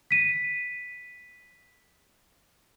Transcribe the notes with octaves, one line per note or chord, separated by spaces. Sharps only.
B6 D#7